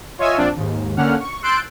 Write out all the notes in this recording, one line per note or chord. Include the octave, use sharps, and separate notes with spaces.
F4 C#5 D#5 E5 G#5 E6
A#1 C4 D4 F4 D5
D#2 G#2
D3 A#3 C#4 F#5 F6
C#6
C6 E6 F#6 G6 A6 D7